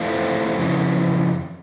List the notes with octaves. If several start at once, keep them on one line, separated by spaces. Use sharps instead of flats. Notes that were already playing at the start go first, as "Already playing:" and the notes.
Already playing: E3 A3 C4 F4
F2 C#3 E3